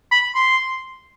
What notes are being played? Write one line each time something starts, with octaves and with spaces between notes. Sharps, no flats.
B5
C6